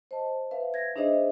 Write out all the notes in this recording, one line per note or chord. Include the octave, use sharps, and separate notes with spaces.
C5 D#5 A5
B4 E5 F5
G#6 A#6
D4 D#4 G#4 C5 D#5 E5